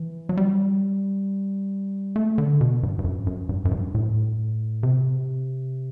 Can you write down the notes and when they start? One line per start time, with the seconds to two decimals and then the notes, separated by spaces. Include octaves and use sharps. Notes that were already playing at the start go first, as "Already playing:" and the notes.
Already playing: E3
0.29 F#3
0.37 G3
2.16 A3
2.38 D3
2.61 B2
2.83 G2
2.99 G2
3.04 F#2
3.27 F#2
3.49 G2
3.65 F#2
3.71 G2
3.95 A2
4.83 C3